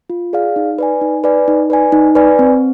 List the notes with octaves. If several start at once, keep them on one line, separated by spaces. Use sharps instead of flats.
F4
G#4 D5 F5
D#4
B4 D5 G#5
D#4
B4 D5 G#5
D#4
B4 D5 G#5
D#4
B4 D5 G#5
C4